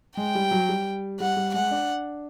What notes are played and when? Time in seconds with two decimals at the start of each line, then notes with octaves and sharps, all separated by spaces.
0.17 G#3 G5
0.35 G3
0.51 F#3
0.69 G3
1.20 G3 F#5
1.37 G3
1.54 G#3 F#5
1.71 D4